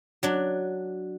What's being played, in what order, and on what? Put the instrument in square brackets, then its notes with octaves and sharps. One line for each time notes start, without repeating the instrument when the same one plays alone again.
[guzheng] F#3 D4